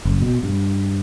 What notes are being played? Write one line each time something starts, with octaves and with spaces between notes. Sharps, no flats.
F#1
B2
G2